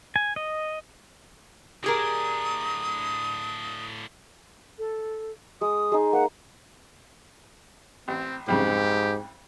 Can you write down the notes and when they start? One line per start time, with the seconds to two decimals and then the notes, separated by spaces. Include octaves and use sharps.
0.16 G#5
0.36 D#5
1.84 A2 D4 G4 G#4 A#4 D#6
4.79 A4
5.61 G#3 D#6
5.92 G#3 D#4
6.13 A#3 F#5
8.08 A1 C4
8.48 C2 F2 G#2 C#3 G4